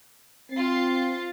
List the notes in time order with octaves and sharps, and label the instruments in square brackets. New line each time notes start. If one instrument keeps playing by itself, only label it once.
[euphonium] C4 [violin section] F4 A6 C7